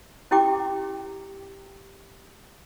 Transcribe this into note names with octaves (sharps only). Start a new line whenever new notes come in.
C#4 E4 G4 G5 D6